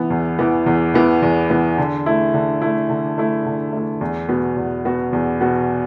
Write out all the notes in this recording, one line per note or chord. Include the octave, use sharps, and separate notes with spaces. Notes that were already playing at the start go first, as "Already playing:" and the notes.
Already playing: E3 B3
E2
E3 B3
E2
E3 B3
E2
E3 B3
D3
A3 E4
D3
A3 E4
D3
A3 E4
D3
A3 E4
E2
B2 B3 F#4
E2
B2 B3 F#4
E2
B2 B3 F#4